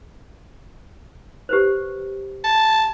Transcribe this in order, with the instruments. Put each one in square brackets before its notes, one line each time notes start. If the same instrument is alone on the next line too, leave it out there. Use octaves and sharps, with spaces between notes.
[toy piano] G4 B4 C5
[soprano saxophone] A5